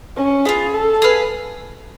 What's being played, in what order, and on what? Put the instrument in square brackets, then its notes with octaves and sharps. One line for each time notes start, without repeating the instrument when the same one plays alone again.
[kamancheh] C#4
[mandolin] B3 D4 F4 [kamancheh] G#4
[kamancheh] A4
[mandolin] G#4 B4 F5